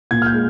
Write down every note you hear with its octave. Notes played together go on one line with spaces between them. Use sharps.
A#2 G#6
F6
G6
G#3